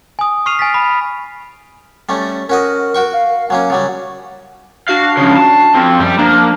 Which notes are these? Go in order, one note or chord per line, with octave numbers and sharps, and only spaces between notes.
G#5 D#6
C#6 F6 C7 D#7 F7
G#5 A6 B6
B5
G3 A3 C#4
C#4 F#4 A#4 D#5
F#4 G5 C#6
F5
F#3 A#3 C#4 G#5
C#3 F#3 G3
D4 F#4 F5 C7
C#3 F3
A5
F3 C4
F#2 F3 G3
F3 A#3 D4